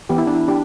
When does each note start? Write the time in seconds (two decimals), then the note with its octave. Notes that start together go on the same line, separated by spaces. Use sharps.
0.09 E3 B3 G4
0.18 E4
0.27 D4
0.35 E4
0.48 D4 G4